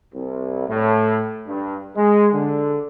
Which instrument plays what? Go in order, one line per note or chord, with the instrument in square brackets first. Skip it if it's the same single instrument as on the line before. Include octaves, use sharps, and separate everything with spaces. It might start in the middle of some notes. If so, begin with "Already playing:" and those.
[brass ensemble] C2
A2
G2
G#3
D3